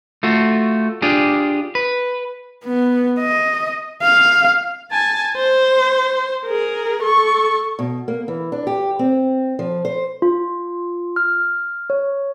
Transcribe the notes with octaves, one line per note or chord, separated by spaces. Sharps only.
A3 F4 F#4
D4 F4 G4 G#4
B4
B3
D#5
F5
G#5 A5
C5
G#4 A#4
A4 C#6
B2
A#3
E3
D4
G4
C4
F3
C5
F4
F6
C#5